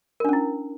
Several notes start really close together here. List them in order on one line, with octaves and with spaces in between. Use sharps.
A#4 D4 C#4 E4